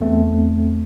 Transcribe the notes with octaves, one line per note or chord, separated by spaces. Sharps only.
E2 A3 C4